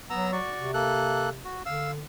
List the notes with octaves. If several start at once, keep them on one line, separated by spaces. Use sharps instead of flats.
F#3 B3 A#5 E6
F#4 D5 C#6
C3
A#3 A4 F#6
F#4
D3 F5 E6